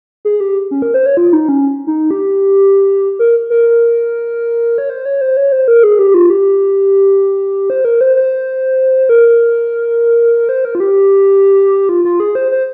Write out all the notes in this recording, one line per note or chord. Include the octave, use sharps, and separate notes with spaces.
G#4
G4
C#4
A#4
C5
C#5
F4
D#4
C#4
D#4
G4
A#4
A#4
C#5
C5
C#5
C5
C#5
C5
A#4
G#4
G4
F4
G4
C5
A#4
C5
C5
A#4
C5
A#4
F4
G4
F4
F4
G#4
C5
C5